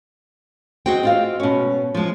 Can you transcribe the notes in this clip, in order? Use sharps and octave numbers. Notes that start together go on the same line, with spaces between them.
G#3 C4 F#4 G#4 G5
C4 F4 F5
B2 C#4
F3 G#3